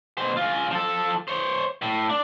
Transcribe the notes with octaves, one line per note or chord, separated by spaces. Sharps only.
B2 C5
C#3 F4
F3 A4
C5 C#5
A2
D4